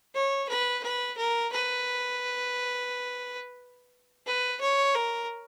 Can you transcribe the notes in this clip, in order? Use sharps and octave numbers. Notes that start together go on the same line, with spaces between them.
C#5
B4
B4
A#4
B4
B4
C#5
A#4